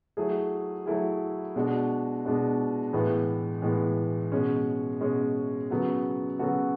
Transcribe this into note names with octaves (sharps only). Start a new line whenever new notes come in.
F#3 A3 E4 G#4
F#3 A3 E4 G#4
B2 G#3 D4 F#4
B2 G#3 D4 F#4
A2 E3 G#3 B3
A2 E3 G#3 B3
B2 G#3 C#4
B2 G#3 C#4
C#3 F#3 B3 F#4 A4
C#3 F#3 B3 F#4 A4